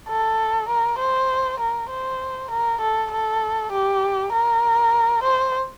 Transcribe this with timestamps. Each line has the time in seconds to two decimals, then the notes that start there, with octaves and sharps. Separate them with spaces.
0.09 A4
0.69 A#4
0.99 C5
1.60 A#4
1.90 C5
2.51 A#4
2.81 A4
3.11 A4
3.72 G4
4.33 A#4
5.23 C5